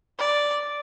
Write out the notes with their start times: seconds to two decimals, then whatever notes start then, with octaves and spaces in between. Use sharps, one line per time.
0.19 D5